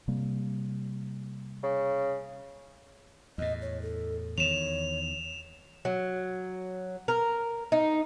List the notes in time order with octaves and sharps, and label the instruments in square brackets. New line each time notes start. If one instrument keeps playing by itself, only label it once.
[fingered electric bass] C3 G3 A#3
[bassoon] C#3
[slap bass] E2 A2 [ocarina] D#5
[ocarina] C#5
A4
[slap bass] E2 D#3 [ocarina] C#5 [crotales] E7 F7
[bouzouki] F#3
A#4
D#4